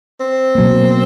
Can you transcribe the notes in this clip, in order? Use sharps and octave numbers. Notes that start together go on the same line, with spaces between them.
C4
B2 F#3 A#3